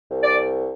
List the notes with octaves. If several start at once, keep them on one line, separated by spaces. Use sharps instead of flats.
C2
D5